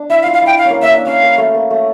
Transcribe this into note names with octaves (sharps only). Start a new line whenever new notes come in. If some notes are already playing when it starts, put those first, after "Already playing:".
Already playing: D4
E4 E5
F5
F4
F5
E4 G5
F5
C#4
A#3
A#3 E5
D4
C#4 F5
A#3
A3
A#3
A3